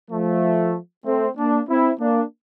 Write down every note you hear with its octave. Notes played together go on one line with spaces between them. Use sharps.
F3 A3
A3 C4
A#3 D4
C4 E4
A#3 D4